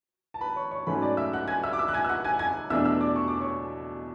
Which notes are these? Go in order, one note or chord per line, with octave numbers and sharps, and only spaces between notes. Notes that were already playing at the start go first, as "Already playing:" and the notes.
A5
B4 B5
C#5 C#6
C#5 C#6
G#2 F#3 A3 C#4 B4 B5
D5 D6
E5 E6
F#5 F#6
G#5 G#6
E5 E6
D6
E5 E6
F#6
G#5 G#6
E6
F#5 F#6
G#5 G#6
G#5 G#6
E2 B2 A3 D4 E5 E6
E5 E6
D5 D6
C#6
D6
C#5 C#6